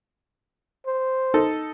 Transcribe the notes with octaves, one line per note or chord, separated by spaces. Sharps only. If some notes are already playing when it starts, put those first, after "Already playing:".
C5
D#4 A4